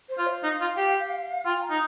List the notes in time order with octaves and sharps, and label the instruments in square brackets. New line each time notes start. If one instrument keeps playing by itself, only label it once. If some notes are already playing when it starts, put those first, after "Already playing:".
[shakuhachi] C5
[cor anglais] F4
[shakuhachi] F5
[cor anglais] D#4
F4
G4
[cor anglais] F4 [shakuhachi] G5
[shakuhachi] A#5
[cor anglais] D#4